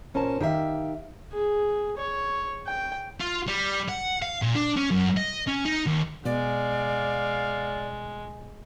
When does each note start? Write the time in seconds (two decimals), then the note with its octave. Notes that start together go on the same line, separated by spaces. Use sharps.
0.14 A#2 C#4 A#4 C5 A5
0.41 D#3 G4 A#4 E5 F5
1.33 G#4
1.98 C#5
2.67 G5
3.20 F4
3.47 G3
3.89 F#5
4.22 F5
4.42 A#2
4.55 D4
4.77 C#4
4.91 F#2
5.17 D#5
5.47 C#4
5.65 D#4
5.87 D#2
6.25 B2 G#3 D5 F5